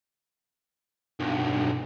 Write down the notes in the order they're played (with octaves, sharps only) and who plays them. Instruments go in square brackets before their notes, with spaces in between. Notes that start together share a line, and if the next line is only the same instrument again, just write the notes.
[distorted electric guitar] B1 G2